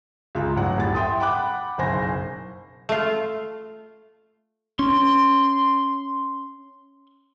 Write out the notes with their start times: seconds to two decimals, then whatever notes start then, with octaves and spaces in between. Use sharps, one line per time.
0.35 C#2 F4 G#4 A#5
0.56 A1 F#3 F#5
0.78 D#1 A2 A6
0.95 E5 G5 C6 D#6
1.20 F#5 G5 B5 D6 F#6
1.78 F#1 B1 C5 G#5 A#6
2.89 A3 F4
4.79 C#4 C6